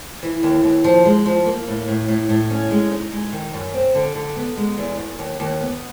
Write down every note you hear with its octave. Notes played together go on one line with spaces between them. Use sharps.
E3
D#2
D#2
F3
G#3
F3
A#3
A2
A2
A2
A2
C#4
G#3
D#4
G#3
D#3
F#2
C4
D3
D3
B3
G#3
E2
E2
D#2
D#2
B3